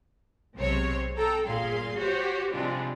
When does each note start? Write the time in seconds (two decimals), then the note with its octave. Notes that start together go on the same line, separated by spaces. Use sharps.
0.56 B1 C3 G#3 C5 C#5
1.16 A4 G5 A#5
1.46 G1 A#2 G#4 F5 C6
1.98 F#4 G4 C5 C#5
2.53 C3 F3 G3 G#3 D4 F4